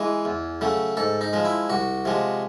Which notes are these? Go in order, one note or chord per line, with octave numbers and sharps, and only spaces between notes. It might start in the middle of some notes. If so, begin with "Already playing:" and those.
Already playing: E3 G#3 G#4
E2
C#3 F#3 A3
G#2 A4
D#4
F3 G#3
E4
C2 F#4
C3 F3 G#3